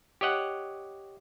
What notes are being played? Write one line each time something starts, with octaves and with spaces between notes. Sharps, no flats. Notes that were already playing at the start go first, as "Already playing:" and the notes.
G4 C#5 D#5 F#5